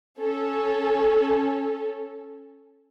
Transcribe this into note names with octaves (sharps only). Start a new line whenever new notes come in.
C#4 A4